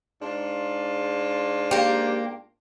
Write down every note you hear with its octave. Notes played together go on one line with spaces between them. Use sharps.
G#2 D4 F4
A#3 G4